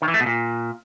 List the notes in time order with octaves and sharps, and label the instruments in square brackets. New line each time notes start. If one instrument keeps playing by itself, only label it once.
[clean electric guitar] D#3
E3
A3
B2
A#2